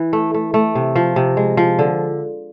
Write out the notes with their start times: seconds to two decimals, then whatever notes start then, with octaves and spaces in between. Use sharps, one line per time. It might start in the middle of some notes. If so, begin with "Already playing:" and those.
Already playing: E3
0.13 A3
0.34 A3
0.54 A3
0.75 C3
0.96 F3
1.16 C3
1.37 G#3
1.57 F3
1.79 D3